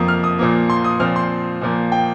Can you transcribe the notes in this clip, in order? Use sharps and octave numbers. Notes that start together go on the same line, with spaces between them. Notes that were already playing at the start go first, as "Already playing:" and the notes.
Already playing: F2 F3 A#3 A#5 D#6
F6
D#6
A#2 F3 A#3
C6
D#6
A#2 F3 C4 F6
C6
A#2 F3 A#3
G5